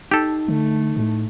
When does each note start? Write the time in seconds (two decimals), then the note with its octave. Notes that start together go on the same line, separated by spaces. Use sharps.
0.11 D#4 G4 A4
0.48 D3 A3
0.96 A2